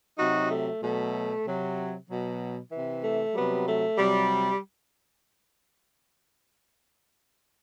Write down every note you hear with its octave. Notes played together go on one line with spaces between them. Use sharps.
C3 F#3 D#4 F#4
A3
B2 F#3 A3
C3 F#3
B2 F#3
C3 E3
A3
C3 F#3 G3 B3
A3
C3 F#3 G3